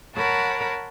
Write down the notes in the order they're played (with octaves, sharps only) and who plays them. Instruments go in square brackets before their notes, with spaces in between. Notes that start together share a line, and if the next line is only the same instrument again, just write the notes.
[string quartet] A#4 C#5 F#5 A5 B5